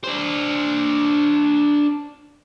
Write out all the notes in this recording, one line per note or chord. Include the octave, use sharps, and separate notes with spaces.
D4 C5